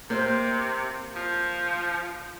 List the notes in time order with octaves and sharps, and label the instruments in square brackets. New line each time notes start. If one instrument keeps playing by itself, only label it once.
[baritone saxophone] C3 [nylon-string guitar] A#3 C5
[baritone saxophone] F3